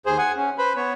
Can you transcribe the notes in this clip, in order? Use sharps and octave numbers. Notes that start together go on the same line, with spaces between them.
D#2 G#4 C5
F#5 G#5
C#4
B4 C5 B5
B3 C#5